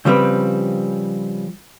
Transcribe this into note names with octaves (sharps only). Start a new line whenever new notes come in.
C#3 F3 G3 C4 B4